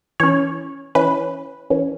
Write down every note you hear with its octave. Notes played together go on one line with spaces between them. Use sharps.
E3 C#4 C#5
E3 C#4 B4
E3 C#4